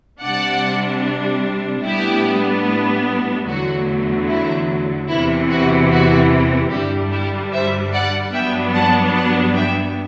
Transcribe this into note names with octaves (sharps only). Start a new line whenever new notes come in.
C3 G3 D4 D5 F#5
A2 G3 B3 D4 E4 G4
E2 D3 F#3 A3 F#4
E4
E2 C3 E3 E4
F#4
F#4
G2 D3 G3 D4 E4 G4
E4 G4
C5 E5
D5 F#5
G2 F#3 B3 D4 E5 G5
F#5 A5
F#5 A5
E5 G5